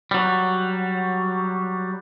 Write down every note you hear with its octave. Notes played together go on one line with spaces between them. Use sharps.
F#3 G3